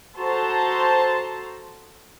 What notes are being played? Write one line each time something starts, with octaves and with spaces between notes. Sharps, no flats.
F#4 A4 C5 A5 A#5 C6